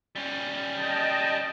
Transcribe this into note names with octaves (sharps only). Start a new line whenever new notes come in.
G3 C#4
D#5 G5 A5